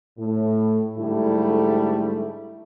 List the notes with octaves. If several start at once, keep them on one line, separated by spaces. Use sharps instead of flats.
A2
G#2 D3 G3 A3 E4